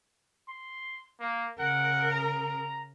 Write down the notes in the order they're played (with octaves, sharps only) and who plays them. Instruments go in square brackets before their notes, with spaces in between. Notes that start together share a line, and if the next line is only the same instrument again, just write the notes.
[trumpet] C6
A#3
[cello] C#3 A#4 [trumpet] F#5
[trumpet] A#5